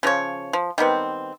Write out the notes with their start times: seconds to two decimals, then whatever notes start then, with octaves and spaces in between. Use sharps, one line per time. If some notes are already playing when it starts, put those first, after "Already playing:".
0.03 C#3 F3 F#4 C#5
0.53 F3
0.78 D#3 G3 B3 C4